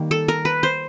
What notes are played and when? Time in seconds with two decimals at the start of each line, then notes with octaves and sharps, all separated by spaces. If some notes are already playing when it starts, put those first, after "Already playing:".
Already playing: D#3 G3 A#3
0.11 A4
0.28 A#4
0.45 B4
0.63 C5